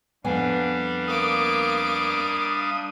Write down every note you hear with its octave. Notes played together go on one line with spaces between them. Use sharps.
F2 G3 B3 D4 F5 G#5
A#3 D6 D#6